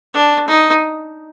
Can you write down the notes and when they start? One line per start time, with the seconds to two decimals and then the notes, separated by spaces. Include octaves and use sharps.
0.14 D4
0.48 D#4